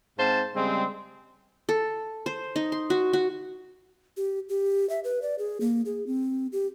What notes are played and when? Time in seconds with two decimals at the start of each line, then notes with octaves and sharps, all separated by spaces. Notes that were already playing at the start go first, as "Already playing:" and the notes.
0.18 G#2 C4 C5 F5 A5
0.55 C#3 G3 G#3 C4
1.69 A4
2.26 C5
2.56 D#4
2.72 C6
2.90 F#4
3.13 F#4
4.17 G4
4.49 G4
4.89 E5
5.04 B4
5.22 D5
5.39 G#4
5.61 A#3
5.85 G#4
6.07 C4
6.52 G4